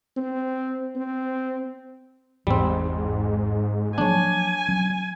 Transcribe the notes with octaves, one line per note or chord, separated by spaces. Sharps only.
C4
C4
G#1 E2 G#2 E3 G3 C4
F3 F#3 A#3 D4 C#5 G#5
F#3 C#4